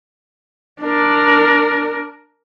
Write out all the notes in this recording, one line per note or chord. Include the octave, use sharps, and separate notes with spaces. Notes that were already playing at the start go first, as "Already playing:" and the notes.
D4 A#4